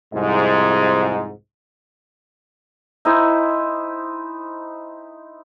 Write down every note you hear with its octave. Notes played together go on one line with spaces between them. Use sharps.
C2 F2 G#2
D#4 E4 C5 G#5